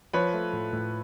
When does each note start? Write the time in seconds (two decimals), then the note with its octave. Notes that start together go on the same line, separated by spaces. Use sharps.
0.13 F3 B4 C#5
0.33 A3
0.53 A2
0.73 A2